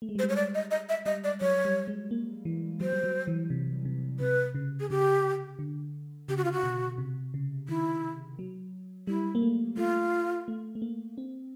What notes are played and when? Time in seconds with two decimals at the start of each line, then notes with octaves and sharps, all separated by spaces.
0.02 A3
0.09 G#3
0.15 G3
0.19 C5
0.24 G#3
0.29 C#5
0.36 D5
0.55 D#5
0.71 D#5
0.89 E5
1.06 G3 D#5
1.24 D5
1.41 F#3 C#5
1.65 G3
1.88 G#3
2.11 A#3
2.45 E3
2.81 F#3 C5
2.93 G3
3.04 F#3
3.27 E3
3.50 C3
3.85 C3
4.20 C3 B4
4.55 C#3
4.80 G#4
4.90 C#3 G4
5.59 D3
6.28 C#3 G4
6.37 F#4
6.44 F4
6.53 F#4
6.63 B2
6.98 C3
7.34 C#3
7.69 D#3 E4
8.39 F#3
9.07 G3 E4
9.35 A#3
9.42 A3
9.77 A3 F4
10.48 A3
10.75 A3
10.82 A#3
11.18 C4